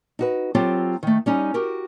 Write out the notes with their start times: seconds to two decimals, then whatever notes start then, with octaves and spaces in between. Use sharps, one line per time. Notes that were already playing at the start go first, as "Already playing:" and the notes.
0.19 D#4 F#4 B4
0.55 F#3 C4 F4 G4 A4
1.03 D#3 A3
1.26 G3 C#4 D#4
1.54 F#4 G4 A#4